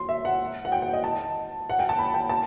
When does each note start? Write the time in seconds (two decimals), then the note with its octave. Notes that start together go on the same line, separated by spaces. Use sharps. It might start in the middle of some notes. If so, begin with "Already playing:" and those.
Already playing: C6
0.09 E5
0.25 F#5
0.65 F#5
0.72 G5
0.82 F#5
0.93 D#5
1.04 A5
1.70 F#5
1.79 G5
1.89 A5
1.99 B5
2.14 G5
2.29 A5